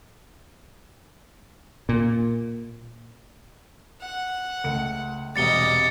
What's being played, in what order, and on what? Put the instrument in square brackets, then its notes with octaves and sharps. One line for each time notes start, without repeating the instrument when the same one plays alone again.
[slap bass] A#2
[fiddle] F#5
[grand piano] C#2 A3 C#7
[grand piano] E1 C3 G3 [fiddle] D#5 D6 [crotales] A6 C#7 G7